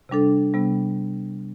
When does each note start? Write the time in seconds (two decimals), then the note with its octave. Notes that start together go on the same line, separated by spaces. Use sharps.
0.09 C3 G3 D4 A4
0.54 C3 G3 B3